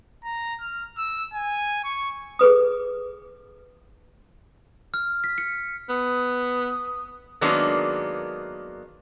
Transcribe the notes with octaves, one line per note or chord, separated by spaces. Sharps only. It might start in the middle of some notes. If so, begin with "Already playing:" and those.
A#5
F6
E6
G#5
C#6
G#4 A4 B4 D#6
F6
B6
C#7
B3 D#6
D#3 F#3 G#3 A#3 B3 D4